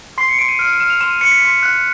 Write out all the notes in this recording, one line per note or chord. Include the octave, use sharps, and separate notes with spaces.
C6 C7
C#7
C6 D7
D#7
F6 D7
D7
F6 E7
F7
C6 E7
D#7
C6 C#7
B6
C6 B6
F#6